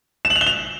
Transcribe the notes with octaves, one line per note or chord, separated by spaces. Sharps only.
E7
F#7
F7
G7
F7